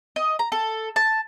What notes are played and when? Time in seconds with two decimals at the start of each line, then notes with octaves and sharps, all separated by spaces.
0.16 D#5
0.39 A#5
0.52 A4
0.96 A5